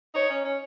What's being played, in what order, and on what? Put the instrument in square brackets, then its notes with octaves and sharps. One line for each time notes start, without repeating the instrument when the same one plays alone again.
[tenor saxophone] D#4 [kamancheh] C#5
[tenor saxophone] C#4
C#4